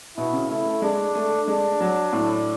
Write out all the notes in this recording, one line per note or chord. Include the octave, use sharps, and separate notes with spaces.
B2 E4
C#3
A3 E4
A3
G#3 D4
A3
G#3 D4
F#3
A2